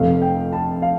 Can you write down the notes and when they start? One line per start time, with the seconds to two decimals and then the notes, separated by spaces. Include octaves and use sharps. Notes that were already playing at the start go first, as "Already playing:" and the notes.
Already playing: F1 F2 C3 A3 F5
0.22 G5
0.53 A5
0.82 F5